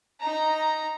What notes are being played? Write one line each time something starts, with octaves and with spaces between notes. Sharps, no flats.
D#4 A#5